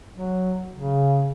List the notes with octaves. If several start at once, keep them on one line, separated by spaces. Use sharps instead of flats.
F#3
C#3